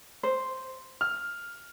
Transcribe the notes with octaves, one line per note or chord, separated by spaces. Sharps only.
C5
F6